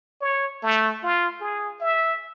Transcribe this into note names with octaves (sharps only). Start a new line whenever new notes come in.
C#5
A3
F4
G#4
E5